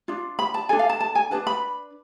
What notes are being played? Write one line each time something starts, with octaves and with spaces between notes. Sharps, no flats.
D4 F4
B5
A5
D4 A4 G#5
F5
A5
A5
G#5
D4 G#4 B4 A5
B5